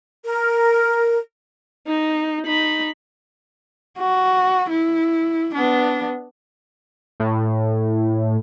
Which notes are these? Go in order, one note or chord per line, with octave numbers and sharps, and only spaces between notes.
A#4
D#4
D#4 B5
F#4
E4
B3 D4
A2